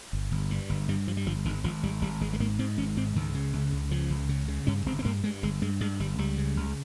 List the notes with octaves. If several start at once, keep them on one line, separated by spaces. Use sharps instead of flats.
G1
G1
G2
G1
G2 G3
G2 F3
G3
G1 F3
G1 D#3
G#1 F3
G#1 G3
G#1 G3
G#1 G#3
G#3
G#2 A#3
G#2 C4
G#1 C#4
G#2 C4
C#2 D#3
C#3
C#2
C#2
C#3 F3
C#2
C#3
C#3
G2 C#4
G1 C4
C4
G2 A#3
G2 G#3
G1 G#3
G2 G#3
G2 G#3
G1 G3
C#2 G3
C#3
C#2